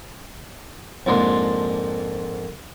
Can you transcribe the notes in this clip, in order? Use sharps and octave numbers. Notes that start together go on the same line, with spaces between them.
F2 G#2 A#3 D4 C6